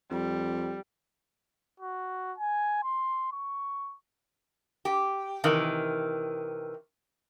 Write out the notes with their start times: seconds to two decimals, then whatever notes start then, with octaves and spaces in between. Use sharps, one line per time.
0.11 F2 G3
1.80 F#4
2.38 G#5
2.83 C6
3.32 C#6
4.85 G4
5.44 C3 D#3 E3